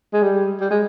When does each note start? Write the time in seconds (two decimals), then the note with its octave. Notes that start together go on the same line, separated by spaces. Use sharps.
0.13 G#3
0.23 G3
0.60 G3
0.71 G#3